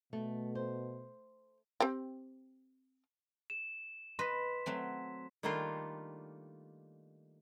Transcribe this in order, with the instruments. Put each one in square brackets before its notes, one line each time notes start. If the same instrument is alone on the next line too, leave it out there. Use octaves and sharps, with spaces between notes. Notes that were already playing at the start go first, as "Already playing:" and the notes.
[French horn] B2 [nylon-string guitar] A3
[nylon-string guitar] C5
[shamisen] C4 G4 G5
[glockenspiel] E7
[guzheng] B4 D#5 [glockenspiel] C6 B6
[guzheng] F#3 A3 C4
[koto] D#3 G3 A3 A#3 D4 F4